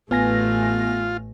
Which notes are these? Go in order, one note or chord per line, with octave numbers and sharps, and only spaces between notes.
A1 A3 B3 F4 G#5 A#6